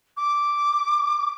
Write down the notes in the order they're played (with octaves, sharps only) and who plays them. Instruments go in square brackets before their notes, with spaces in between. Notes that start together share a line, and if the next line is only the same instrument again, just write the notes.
[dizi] D6